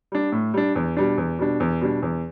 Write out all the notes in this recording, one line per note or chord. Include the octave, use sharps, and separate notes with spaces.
G3 D4
A2
G3 D4
E2
B2 G3 D4
E2
B2 G3 D4
E2
B2 G3 D4
E2